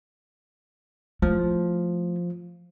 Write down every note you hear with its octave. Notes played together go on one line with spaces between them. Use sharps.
F3 A3 E4